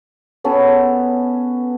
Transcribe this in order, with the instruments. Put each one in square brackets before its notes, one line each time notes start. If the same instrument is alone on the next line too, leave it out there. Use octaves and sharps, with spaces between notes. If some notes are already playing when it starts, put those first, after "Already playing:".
[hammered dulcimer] B3 C#4 A4 B4